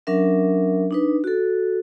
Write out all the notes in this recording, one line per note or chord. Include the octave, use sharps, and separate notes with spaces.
F#3 C#4 D4 A#4 E5
D4 D#4 B4
F#4 A4